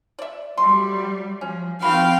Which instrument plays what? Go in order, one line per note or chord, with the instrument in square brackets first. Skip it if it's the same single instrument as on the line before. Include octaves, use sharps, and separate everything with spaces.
[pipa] D5 E5
[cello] F#3 G3 [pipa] A3 C6
[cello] F3 [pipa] C#4
[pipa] D#3 F#4 B5 [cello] F3 C4 [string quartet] F5 G5